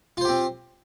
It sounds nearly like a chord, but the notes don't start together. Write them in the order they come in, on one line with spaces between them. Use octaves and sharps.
F4 C5 G4 C4